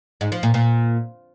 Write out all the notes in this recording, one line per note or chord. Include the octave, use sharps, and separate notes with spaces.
G#2
F3
A#2
A#2